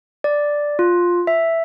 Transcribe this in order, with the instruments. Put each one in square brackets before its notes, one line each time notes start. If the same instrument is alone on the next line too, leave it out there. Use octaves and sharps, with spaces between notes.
[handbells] D5
F4
E5